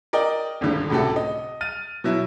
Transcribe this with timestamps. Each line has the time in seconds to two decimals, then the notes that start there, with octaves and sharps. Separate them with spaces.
0.13 A#4 D5 D#5 G5
0.61 D#1 G#1 C#2 G2 D3
0.90 C#2 A2 C3 F#4 A4
1.16 D#5
1.61 F6 A6 D#7
2.04 B2 F#3 E4